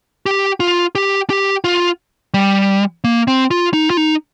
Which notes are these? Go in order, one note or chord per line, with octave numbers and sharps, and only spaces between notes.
G4
F4
G4
G4
F4
G3
A#3
C4
F4
D#4
F4
D#4